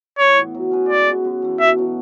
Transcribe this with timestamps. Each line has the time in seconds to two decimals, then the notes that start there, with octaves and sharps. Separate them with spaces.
0.19 A2 C#5
0.37 E3 B3
0.54 F#3
0.71 C#4 G#4 B4
0.89 G#3 D5
1.07 B3 F#4
1.25 F#2
1.42 E3 A3
1.60 B2 E5
1.77 F#3 B3